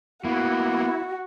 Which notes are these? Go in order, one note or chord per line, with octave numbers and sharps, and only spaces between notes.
A#3 B3 E4 F#4